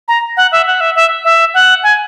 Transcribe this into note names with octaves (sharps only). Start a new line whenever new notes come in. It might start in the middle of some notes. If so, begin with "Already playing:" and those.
A#5
F#5
E5
F#5
E5
E5
E5
F#5
G#5